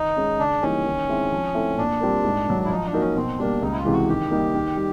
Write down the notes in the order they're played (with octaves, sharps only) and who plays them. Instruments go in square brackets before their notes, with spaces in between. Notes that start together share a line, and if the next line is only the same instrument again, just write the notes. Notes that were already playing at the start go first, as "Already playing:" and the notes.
Already playing: [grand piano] D#3 [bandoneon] D#4
[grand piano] G#3 C#4
[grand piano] C#3 [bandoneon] D4
[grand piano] E3 G3 A#3 D#4 [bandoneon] C#4
[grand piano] D#3
G#3 C4 E4
F3
A3 C4 E4 A4
[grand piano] A#2 [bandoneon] D4
[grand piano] G3 C4 F4 A#4
G#2
D#3 F#3
[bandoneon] E4
[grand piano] F3 [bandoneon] D#4
[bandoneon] D4
[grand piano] A#3 D#4 F#4 A#4
[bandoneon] C#4
[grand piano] B2 [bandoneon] C4
[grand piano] G3 A#3 [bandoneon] D4
[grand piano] C#2 [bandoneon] D#4
[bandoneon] E4
F4
[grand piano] C3 E3 G#3
[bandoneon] F#4
[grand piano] D#3 [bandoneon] G4
[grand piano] G3 A#3 D#4
D#3
G3